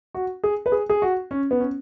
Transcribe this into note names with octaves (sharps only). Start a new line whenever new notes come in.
F#4
G#4
B4
G#4
G#4
F#4
C#4
B3
C#4